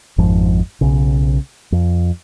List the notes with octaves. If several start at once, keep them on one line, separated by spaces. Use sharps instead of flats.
G#1 F2 G#2 F3
B1 C#3
F2